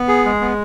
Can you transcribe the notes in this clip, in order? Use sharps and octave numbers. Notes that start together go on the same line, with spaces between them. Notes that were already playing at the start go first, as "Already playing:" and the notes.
Already playing: B3
G#4
G#3
B3